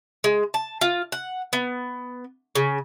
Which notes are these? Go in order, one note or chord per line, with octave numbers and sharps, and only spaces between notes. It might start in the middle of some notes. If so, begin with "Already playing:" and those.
G#3
A5
F4
F#5
B3
C#3